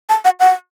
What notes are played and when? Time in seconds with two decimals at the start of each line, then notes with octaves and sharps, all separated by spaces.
0.09 A5
0.25 F#5
0.40 F#5